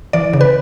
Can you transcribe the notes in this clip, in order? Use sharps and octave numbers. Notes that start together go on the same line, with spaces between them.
E3 D5
C#3
B4